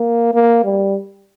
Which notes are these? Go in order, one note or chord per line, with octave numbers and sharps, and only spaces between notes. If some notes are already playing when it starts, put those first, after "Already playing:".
Already playing: A#3
A#3
G3